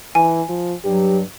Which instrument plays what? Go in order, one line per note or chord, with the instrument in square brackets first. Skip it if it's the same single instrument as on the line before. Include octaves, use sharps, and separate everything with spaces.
[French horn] E3 [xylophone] G#5
[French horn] F3
[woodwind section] G2 F#3 [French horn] G4